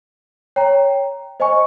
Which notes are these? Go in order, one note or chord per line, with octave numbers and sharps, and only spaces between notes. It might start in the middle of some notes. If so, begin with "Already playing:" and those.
C#5 G5 A#5
C5 D#5 G#5 C#6